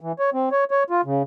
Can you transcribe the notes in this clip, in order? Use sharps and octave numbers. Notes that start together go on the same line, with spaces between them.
E3
C#5
C4
C#5
C#5
F4
C#3